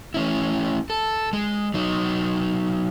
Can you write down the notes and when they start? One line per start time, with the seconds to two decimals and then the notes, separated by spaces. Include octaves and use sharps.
0.14 A3 C#4 E4
0.90 A4
1.33 G#3
1.74 F#3 D#4